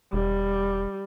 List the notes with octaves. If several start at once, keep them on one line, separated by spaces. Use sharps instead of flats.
E1 G3